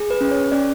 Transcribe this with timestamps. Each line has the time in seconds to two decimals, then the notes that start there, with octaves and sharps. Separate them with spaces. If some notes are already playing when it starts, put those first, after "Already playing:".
Already playing: G#4
0.11 B4
0.21 C#4
0.31 C#5
0.52 C#4 D5